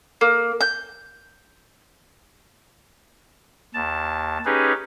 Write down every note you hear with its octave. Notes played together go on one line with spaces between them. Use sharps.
A#3
G6
D#2 A5
C#4 D#4 G4 G#4 B4